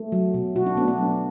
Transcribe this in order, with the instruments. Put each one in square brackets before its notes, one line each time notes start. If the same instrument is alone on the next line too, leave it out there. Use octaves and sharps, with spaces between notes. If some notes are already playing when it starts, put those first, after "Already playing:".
Already playing: [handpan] A3
F#3
B2
B2 F#4
D4
A3 B3
D4
F#3